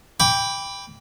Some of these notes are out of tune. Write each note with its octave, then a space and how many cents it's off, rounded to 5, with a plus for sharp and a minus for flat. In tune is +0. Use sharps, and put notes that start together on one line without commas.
G5 +15 B5 +0 D6 -25